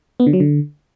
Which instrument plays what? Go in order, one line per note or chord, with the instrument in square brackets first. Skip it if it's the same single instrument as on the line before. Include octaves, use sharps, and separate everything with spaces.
[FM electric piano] B3
D3
F#3
D3